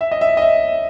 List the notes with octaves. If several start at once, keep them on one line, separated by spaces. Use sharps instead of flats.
E5
D#5
E5
D#5
E5